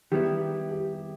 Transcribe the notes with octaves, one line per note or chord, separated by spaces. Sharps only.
D#3 G3 B3 E4 G4
G4